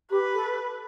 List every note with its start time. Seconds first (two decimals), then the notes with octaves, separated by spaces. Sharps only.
0.11 G4 B4
0.35 A4